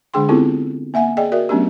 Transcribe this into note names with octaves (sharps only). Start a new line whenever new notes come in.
D3 G#3 D4 G#4 G5 C6
B3 C4 E4 F4 G4 A4
A#3 E5 F#5 G#5
G#4 D5 D#5 G5
F#4 A#4 D5 E5
F#3 A3 B3 C#4 D4 G4